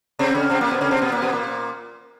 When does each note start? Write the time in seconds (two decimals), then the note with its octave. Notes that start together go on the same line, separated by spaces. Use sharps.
0.19 C3 C4
0.35 C#3 C#4
0.50 C3 C4
0.61 A#2 A#3
0.71 B2 B3
0.81 C#3 C#4
0.91 C3 C4
1.02 B2 B3
1.12 A#2 A#3
1.22 B2 B3
1.32 A#2 A#3